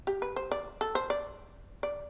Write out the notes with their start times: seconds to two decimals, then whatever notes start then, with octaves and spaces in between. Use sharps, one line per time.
0.07 G4
0.22 B4
0.36 C5
0.51 D5
0.81 A4
0.95 C5
1.10 D5
1.83 D5